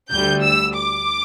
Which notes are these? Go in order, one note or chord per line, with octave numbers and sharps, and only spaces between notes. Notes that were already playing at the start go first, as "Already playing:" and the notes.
D2 D3 G3 G6
E6
D6